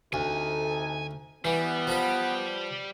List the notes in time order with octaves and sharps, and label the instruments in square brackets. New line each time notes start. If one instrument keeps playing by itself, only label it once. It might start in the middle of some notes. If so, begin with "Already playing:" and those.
[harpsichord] D2 [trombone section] C3 D#4 A4 [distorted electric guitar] G#5
[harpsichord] E3 [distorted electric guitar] G3 [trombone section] B3
[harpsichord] F3 B4